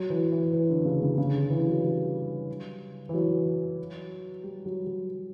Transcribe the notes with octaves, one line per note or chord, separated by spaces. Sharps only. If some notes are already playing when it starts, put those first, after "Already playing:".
Already playing: F#3
E3
E3
E3
D3
C#3
C#3
C#3
D3
E3
F#3
G3
E3
F#3
G3
F#3
F#3